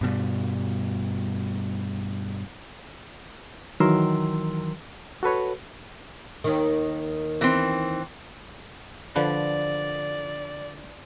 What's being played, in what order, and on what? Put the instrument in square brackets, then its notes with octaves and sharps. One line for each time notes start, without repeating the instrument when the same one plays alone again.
[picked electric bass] G2 B2 G3
[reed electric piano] D#3 E3 F#3 A#4 C6 E6
F#4 A4 B4 C#5
[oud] D#2 D#3
[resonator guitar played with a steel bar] E3 C4
[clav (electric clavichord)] D3 F3 B4 [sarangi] D5